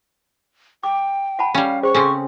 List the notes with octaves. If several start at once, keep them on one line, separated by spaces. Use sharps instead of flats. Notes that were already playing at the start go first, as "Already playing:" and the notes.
G5 D6
F#5 A5 B5
G3 C#4 F5 G5
G#4 C5 G5 C#6
C#3 C4 C#4 A4 G5 C6